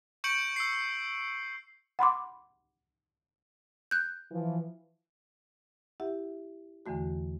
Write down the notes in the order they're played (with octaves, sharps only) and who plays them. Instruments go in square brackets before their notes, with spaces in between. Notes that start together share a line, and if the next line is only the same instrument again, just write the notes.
[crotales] C#6 G6 C#7 D7 F#7
E6 C7
[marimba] F#5 B5 C6 D6
[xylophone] F#6 G6
[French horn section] E3 F3
[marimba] E4 G4 E5 F#5
E2 D3 E3 A3 F#4